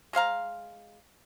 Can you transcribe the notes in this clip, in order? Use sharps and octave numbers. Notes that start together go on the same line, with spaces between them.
G#3 C5 F5 A#5